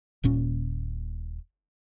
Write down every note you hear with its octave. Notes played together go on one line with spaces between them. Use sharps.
D#1 A#2 C#4